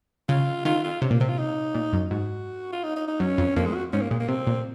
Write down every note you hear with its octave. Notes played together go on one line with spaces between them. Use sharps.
C#3 F4
D#3 F4
F4
C3 C#4
A#2 A#3
C3 C4
F4
D#4
A#2
F#2
G#2 F#4
F4
D#4
D#4
D#4
F#2 C#4
F2
F2 A#3
G#3
F#4
G#2 C#4
A#3
A#2 G#3
A#3
C3 C4
A#2